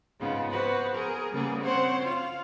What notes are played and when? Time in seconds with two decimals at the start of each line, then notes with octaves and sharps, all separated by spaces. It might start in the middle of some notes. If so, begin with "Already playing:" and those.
0.20 G#2 C#3 B3 F4
0.52 B3 F#4 B4 C5
0.94 G#4 A#4
1.33 C#3 G3 A#3 B3 G#4
1.63 C4 C5 C#5 F#5
2.03 F4 F5